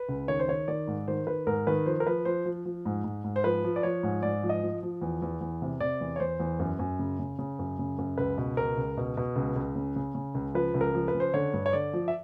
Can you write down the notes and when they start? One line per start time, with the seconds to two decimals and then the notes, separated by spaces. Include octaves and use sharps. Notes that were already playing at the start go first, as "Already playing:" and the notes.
Already playing: B4
0.09 C#2
0.28 D#3 C#5
0.39 C5
0.48 D#3 C#5
0.68 D#3 D5
0.87 G#2
1.08 D#3 C5
1.27 D#3 B4
1.47 G#2 A#4
1.67 D#3 B4
1.86 F3 C5
2.00 A#4
2.07 F3 B4
2.25 F3 C5
2.46 F3
2.65 F3
2.86 G#2
3.04 G#2
3.24 G#2
3.36 C5
3.44 F3 B4
3.64 F3
3.76 D5
3.83 F3 C#5
4.03 G#2
4.23 G#2 D5
4.43 F3
4.49 D#5
4.63 F3
4.83 F3
5.02 E2
5.22 E2
5.41 E2
5.62 C3
5.80 C3 D5
6.01 E2
6.16 C#5
6.20 E2 C5
6.40 E2
6.59 F#2
6.79 F#2
6.99 C#3
7.19 C#3
7.39 C#3
7.59 F#2
7.79 C#3
7.98 F#2
8.18 C#2 B4
8.38 B2
8.57 C#2 A#4
8.77 C#2
8.97 B2
9.17 B2
9.36 C#2
9.56 C#2
9.75 C#3
9.96 C#3
10.15 C#3
10.35 C#2
10.54 F3 B4
10.74 C#2
10.81 A#4
10.94 F3
11.08 B4
11.14 C#3
11.20 C5
11.34 D3 C#5
11.53 G2
11.66 C#5
11.73 D3 D5
11.93 F3
12.08 E5